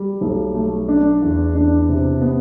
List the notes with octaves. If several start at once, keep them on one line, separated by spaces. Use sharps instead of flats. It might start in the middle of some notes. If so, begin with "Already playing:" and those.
Already playing: G3
B1
A3
D4
E2
D4
C3
B3